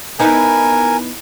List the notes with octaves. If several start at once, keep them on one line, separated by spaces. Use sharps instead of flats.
B3 D#4 E4 A#4 G#5